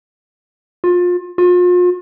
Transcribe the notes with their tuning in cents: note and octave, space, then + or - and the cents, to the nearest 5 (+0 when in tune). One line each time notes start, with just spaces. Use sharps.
F4 +30
F4 +40